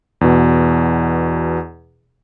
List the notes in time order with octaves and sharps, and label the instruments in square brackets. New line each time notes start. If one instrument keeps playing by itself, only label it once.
[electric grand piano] E2 B2